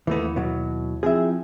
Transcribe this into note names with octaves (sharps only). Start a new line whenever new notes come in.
D#2 E3 A3 B3 E4
B2 F#3
F3 C4 E4 G#4 E5